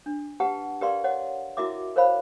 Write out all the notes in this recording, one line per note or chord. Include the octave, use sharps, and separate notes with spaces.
D4
G4 B4 F#5 A5
G4 A#4 B4 D5 F5 C6
C#5 D#5 F#5
E4 F#4 A#4 D#5 E5 D6
A#4 C5 C#5 F5 B5